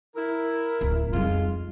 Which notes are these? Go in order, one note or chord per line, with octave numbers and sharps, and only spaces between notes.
E4 A#4
D1 F4
F2 G3 G#3 D#4 F4